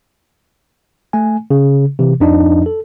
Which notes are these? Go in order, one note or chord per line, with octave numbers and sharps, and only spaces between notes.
A3 G#5
C#3
C3 E3
F2 F3 D4 D#4 D#5
A4